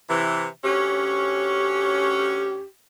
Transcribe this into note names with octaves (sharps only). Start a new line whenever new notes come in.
C3 E3
D2 C#4 G4